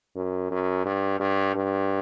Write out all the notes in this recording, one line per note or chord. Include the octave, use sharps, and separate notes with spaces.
F#2
F#2
G2
G2
G2